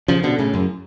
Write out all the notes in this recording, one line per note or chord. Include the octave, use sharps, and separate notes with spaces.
C#3 F3
B2 D3
A2 C#3
F#2